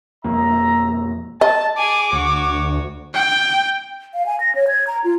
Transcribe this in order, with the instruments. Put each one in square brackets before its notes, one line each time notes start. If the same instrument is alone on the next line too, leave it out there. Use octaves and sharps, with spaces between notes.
[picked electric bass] E1 F2 A#3 [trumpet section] E5 A#5
[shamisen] D#5 [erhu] A5
[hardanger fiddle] G#4 G#5 [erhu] D6
[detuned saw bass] D2 [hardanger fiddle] F#4 C#5
[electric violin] G5
[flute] F5
G#5
A#6
C#5
G#6
A#5
F4